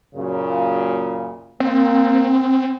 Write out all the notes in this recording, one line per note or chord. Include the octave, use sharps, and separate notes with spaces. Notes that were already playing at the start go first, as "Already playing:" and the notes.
F#2 A#2 C#3
A#3 C4